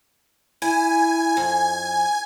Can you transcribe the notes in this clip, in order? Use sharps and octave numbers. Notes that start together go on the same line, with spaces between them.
E4 G#5
F2